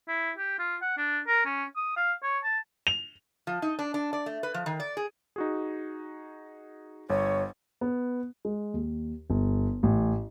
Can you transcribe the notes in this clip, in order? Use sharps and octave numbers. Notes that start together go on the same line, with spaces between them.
E4
G4
F4
F#5
D4
A#4
C#4
D#6
F5
C#5
A5
F7
F3
D#4
D4
D4
D5
A3
B4
F3
D#3
D5
G#4
D#4 F#4 G#4
G1 C#5
B3
G#3
D#2
G1
A1